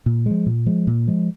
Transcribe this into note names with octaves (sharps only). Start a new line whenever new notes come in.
A#2
F3 G#3
A#2
F3 G#3
A#2
F3 G#3